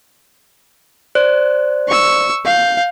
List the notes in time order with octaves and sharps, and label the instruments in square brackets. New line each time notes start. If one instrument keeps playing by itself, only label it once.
[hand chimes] C5 D5 F#6
[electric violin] C#6 E6
F5 G6